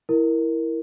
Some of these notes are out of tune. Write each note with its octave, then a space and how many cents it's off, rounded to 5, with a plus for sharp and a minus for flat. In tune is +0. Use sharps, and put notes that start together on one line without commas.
E4 +0 A#4 +0